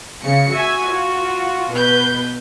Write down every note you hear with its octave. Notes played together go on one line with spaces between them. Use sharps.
C#3 C#7
F#4 E5 G#5
F4
B2 B4 G6